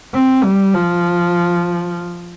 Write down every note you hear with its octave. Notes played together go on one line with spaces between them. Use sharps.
C4
G3
F3